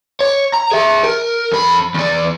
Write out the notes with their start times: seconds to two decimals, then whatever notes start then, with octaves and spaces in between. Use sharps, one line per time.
0.21 C#5
0.54 A#5
0.72 G#4 E5
1.04 A#4
1.52 F2 B5
1.94 E2 D5